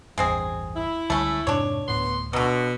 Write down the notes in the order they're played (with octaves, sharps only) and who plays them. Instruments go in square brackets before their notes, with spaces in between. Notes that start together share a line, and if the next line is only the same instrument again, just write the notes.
[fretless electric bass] A1 E2 G2 [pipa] G#3 C4 G#4
[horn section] E4
[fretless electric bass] C#2 D3 G3 [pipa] A3 C#4
[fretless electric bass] F2 G#2 C3 [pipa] D4 C#5
[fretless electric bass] D1 A2 [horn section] B3 C6
[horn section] B2 [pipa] D3 F#3